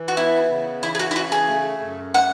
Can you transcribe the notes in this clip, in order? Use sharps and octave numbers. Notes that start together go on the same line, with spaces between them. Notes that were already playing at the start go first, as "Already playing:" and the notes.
Already playing: E3
F#4
B3 E4
C#3
E3 E4
G#4
F#4
E4
C#3 F#4
G#4
A3
F#2
A3 F#5